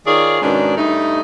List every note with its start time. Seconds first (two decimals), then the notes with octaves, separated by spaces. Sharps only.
0.06 D#3 F4 G#4 C#5 D5
0.42 G#2 B2 D#3 C#4 D4
0.77 G2 A3 D#4